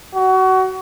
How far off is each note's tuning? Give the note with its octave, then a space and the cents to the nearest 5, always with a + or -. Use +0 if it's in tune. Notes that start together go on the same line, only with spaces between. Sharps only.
F#4 +25